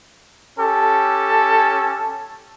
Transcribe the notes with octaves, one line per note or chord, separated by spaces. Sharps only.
C#4 G4 A4